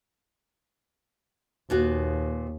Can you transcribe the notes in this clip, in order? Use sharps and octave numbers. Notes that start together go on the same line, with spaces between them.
D#2 A#2 B3 F#4